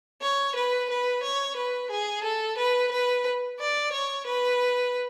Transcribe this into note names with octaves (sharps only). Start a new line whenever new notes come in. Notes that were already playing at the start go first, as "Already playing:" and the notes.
C#5
B4
B4
C#5
B4
G#4
A4
B4
B4
D5
C#5
B4